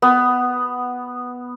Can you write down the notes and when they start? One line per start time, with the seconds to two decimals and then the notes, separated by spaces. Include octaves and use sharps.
0.02 B3